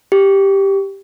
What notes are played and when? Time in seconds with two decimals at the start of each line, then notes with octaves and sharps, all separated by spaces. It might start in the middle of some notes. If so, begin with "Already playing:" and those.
0.12 G4